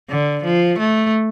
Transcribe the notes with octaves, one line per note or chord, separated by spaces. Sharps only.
D3
F3
A3